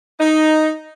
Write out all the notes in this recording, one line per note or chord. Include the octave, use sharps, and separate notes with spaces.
D#4